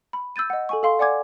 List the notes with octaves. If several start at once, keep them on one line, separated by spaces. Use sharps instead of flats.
B5
E6 G6 A6 D#7
D#5 F#5
A4 G#5 C#6
A4 F5 C6
D5 F#5 G#5 D6 G#6